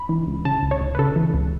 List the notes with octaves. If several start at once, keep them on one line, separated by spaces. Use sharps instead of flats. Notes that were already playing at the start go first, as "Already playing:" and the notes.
Already playing: B5
E3
C#2
C#3 A5
C#2
C#5
C#2
B4
C#3 A4
E3
C#2